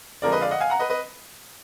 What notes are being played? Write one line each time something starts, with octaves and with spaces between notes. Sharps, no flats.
F2 D3 F3 G#3 A#4 D5
B4 D#5
D5 F5
D#5 F#5
F5 G#5
F#5 A#5
B4 D#5
B4 D#5